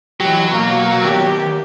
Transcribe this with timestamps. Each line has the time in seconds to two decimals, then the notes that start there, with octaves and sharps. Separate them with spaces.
0.20 E3 F#3 G4
0.52 B2 A#3
1.04 D#3 B3 G4 A#4